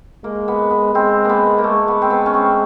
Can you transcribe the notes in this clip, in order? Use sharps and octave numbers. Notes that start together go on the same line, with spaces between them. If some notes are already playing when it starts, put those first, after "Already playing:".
G#3 A#3
B3
B3
G#3 C4
A#3 B3
A#3
G#3 A3
B3
C4
B3
C#4
C4